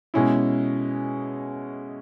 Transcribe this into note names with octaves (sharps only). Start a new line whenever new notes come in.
B2 G#3 C#4 E4